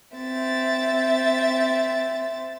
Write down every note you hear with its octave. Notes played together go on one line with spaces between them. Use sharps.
C4 E5 A6